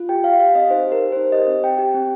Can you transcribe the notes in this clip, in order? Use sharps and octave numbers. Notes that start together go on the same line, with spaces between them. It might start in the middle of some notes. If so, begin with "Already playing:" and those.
Already playing: F4
G4 G5
G4 F5
G4 F5
C4 D#5
D#4 C5
G4
A#4
G4
D#4 C5
G4 D#5
C4
C4 G5
G4
C4